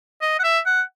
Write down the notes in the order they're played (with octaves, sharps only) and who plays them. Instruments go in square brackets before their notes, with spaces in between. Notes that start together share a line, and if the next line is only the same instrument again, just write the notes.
[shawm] D#5
F#5
E5
F#5